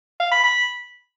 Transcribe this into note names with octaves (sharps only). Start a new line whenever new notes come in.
F5
B5
B5